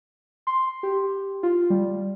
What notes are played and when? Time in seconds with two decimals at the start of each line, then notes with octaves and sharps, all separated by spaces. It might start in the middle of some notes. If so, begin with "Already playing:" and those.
0.47 C6
0.83 G4
1.43 F4
1.70 G3